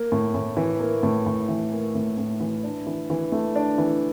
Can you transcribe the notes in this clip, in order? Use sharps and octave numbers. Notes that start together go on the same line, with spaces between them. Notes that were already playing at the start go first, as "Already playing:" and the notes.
Already playing: A#3
A2
A2
E3
A#3
A2
A2
E3
A#3
A2
A2
E3
D4
E3
E3
A3
D4
E3